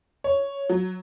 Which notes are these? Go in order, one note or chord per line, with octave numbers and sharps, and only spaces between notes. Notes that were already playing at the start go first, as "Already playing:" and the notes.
C#5
F#3